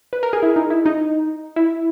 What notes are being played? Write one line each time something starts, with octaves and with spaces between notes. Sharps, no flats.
B4
A#4
G#4
E4
D#4
E4
D#4
E4